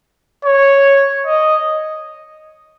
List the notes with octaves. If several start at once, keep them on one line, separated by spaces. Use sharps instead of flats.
C#5
D#5